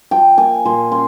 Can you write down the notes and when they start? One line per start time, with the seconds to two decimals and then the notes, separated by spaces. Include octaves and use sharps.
0.11 F3 G5
0.38 A#3 G#5
0.65 A#2 C6
0.92 C#4 C6